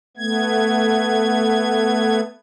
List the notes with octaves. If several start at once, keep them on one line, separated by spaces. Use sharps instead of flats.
A3 B3 G#6